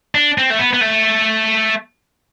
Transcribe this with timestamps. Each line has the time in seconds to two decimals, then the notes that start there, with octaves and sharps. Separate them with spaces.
0.15 D4
0.38 C4
0.50 A3
0.59 B3
0.73 B3
0.81 A3